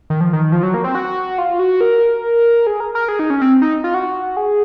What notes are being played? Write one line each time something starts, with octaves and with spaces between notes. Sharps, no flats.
D#3
F3
D#3
F3
F#3
A#3
C4
F#4
F4
F#4
A#4
G#4
A#4
A#4
G#4
D#4
C#4
C4
D#4
F4
F#4
G#4